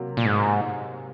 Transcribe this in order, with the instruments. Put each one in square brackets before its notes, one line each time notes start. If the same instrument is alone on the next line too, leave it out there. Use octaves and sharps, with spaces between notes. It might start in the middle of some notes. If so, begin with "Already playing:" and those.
Already playing: [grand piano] C3 F#3 A#3
[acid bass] A#2
G#2